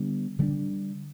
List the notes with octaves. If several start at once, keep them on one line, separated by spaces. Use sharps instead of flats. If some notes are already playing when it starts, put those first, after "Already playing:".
Already playing: D3 G3 B3 D4
D3 G3 B3 D4